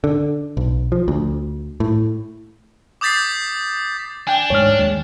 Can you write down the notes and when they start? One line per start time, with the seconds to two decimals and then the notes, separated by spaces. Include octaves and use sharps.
0.04 D3
0.57 B1
0.92 F3
1.08 D2
1.80 A2
3.01 D6 D#6 G6 A6 B6 C7
4.27 D4 G5 G#5
4.50 D2 G#2 C#5 F6
4.79 D#2 G#3